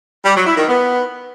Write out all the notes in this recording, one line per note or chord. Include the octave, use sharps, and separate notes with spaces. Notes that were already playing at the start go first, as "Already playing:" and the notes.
G3
F#3
E4
D#3
B3